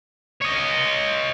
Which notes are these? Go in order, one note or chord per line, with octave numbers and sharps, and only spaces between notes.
C#5 D#5